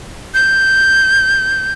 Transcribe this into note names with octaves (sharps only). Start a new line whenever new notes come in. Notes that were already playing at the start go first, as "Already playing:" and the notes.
G6